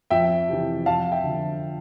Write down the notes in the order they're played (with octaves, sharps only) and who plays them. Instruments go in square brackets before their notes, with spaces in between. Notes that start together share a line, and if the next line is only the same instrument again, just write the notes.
[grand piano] F2 E5 G5
C3 E3
F2 F5 A5
E5 G5
D3 F3